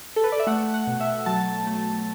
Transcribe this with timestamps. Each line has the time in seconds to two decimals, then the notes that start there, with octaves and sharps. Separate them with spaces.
0.16 A4
0.24 B4
0.32 D5
0.39 E5
0.47 A3 F#5
0.74 F#5
0.87 B2
1.00 E5
1.26 F#3 A5
1.67 A3